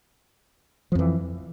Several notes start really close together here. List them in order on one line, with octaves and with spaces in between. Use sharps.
F3 F2 E3